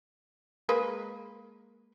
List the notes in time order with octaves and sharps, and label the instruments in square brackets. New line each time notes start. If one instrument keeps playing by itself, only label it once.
[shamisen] G#3 A#3 B4